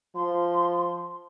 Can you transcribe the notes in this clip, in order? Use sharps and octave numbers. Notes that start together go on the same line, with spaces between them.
F3 C6